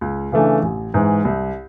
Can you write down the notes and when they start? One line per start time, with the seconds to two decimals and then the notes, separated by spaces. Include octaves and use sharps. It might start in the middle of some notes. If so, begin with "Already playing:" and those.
0.01 C#2
0.32 C#3 E3 A3 D4
0.62 A1
0.94 G#2 E3 G#3
1.25 C2